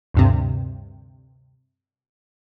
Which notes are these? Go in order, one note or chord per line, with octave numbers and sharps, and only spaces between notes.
D2 G2 C3